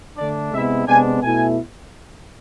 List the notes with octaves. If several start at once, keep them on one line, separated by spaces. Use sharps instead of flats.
D3 A3 D4 D5
C3 G#3 B3 E4 E5
C3 G#3 B3 D4 G#5
B2 A3 E4 G#5